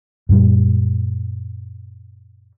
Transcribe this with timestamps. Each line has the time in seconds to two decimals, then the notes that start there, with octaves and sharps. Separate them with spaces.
0.29 F#2 A#2 G3